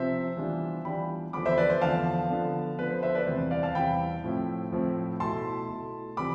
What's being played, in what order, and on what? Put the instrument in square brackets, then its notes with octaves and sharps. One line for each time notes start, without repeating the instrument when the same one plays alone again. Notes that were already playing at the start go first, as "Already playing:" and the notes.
Already playing: [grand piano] C3 F3 C4 C5 E5
E3 G3 B3 D4 F4
E3 G3 B3 D4 F4 G5 B5
E2 D3 F3 B3 B5 D6
C5 E5
B4 D5
C5
E2 D3 F3 B3 F5 A5
D3 F3 B3
D3 F3 B3 B4
C5
C5 E5
B4 D5
E2 C3 G3 C4 E4 C5
D5 F5
F5 A5
E2 C3 G3 C4 E4 G5 B5
A2 F3 C4 E4
A2 F3 C4 E4
B2 A3 E4 A5 C6
B2 A3 E4
C3 E3 G3 C4 F4 B5 D6